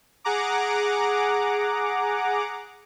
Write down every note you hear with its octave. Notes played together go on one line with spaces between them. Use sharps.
G#4 F#5 A#5 D6